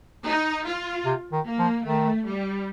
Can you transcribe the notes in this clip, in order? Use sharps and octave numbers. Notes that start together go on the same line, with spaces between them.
D#4
F4
C3
D#3
A#3
F3
D#3 A3
G3